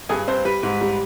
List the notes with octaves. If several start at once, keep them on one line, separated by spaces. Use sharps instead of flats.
G2 G#4 G#5
G2 C4 C5
G3 B4
G#2
G3